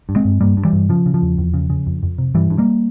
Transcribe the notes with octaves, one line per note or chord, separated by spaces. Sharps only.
G2
G#3 C4
G2
G2 G3 A#3
G2
E3 G3
G2
C#3 F3
C#3
F3
E2
E2
C#3
C#3
F2
F2
C3
G2 E3 G3
G2
G3 A#3